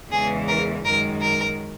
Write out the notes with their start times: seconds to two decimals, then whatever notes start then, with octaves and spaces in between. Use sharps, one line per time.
0.11 E2 C#3 E3 G#3 G#4
0.48 A#4
0.84 F#2 D#3 G#3 A#4
1.21 A#4